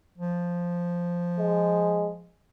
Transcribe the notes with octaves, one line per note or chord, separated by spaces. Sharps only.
F3
G#3